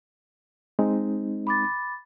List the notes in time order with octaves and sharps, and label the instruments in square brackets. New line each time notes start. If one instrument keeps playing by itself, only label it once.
[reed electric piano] G#3 C4 D#4
[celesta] B5 D6 A6